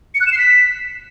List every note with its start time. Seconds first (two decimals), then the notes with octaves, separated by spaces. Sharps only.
0.15 C#7
0.21 F#6
0.26 E7
0.32 C7
0.38 B6